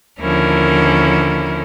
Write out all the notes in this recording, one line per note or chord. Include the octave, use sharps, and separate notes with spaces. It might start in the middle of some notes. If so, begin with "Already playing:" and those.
D#2 D3 F3 C#4 E4 A#4